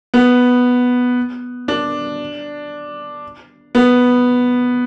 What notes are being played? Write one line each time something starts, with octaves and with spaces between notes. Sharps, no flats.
B3
D4
B3